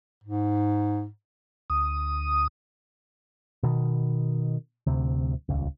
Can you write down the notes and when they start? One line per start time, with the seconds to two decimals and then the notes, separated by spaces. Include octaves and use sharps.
0.24 G#2
1.70 D2 D#6
3.63 B2 D#3
4.87 D1 D2 C3
5.49 D#1 C#2